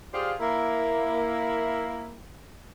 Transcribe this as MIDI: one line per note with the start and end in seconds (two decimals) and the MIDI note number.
0.13 0.34 65
0.13 0.34 67
0.13 0.34 68
0.13 0.34 72
0.13 0.34 74
0.13 0.34 77
0.40 2.18 58
0.40 2.18 64